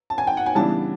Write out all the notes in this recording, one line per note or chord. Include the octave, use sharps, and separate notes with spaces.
A5
G#5
G5
F#5
G#5
C#3 E3 G3 B3 D4 A5